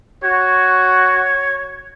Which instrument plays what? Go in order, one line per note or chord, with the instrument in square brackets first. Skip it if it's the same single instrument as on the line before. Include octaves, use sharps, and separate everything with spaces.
[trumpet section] F#4 [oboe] C#5